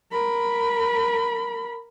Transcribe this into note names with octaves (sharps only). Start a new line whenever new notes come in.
A#4 B5